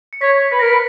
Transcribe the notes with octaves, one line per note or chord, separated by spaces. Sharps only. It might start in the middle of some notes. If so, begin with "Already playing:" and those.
C#7
C#5 B6
B4 B6
A#4 A#6
B4 B6